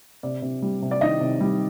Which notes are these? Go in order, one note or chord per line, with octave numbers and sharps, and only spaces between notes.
C3 D5
C3
G3
C3
D5
D#3 D#5
C3
G3